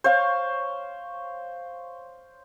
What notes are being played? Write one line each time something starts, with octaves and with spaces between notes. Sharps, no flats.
C5 C#5 F5 C#6